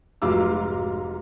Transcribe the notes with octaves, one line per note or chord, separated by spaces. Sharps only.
F1 G#2 F#3 F4 D6 E6